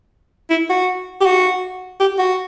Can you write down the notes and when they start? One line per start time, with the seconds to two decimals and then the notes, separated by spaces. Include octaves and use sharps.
0.50 E4
0.70 F#4
1.21 G4
1.26 F#4
2.00 G4
2.19 F#4